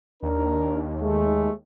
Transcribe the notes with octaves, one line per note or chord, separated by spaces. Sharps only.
D#2 D4 A#4
G#3 A3